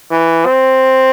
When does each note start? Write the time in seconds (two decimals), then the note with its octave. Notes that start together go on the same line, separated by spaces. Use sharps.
0.11 E3
0.46 C4